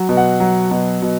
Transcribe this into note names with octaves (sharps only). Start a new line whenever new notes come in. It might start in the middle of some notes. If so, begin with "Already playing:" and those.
Already playing: F#3
B2
F#5
F#3
B2
B2